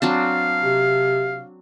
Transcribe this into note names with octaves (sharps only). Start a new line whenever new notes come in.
F#3 C4 D4 F5
C3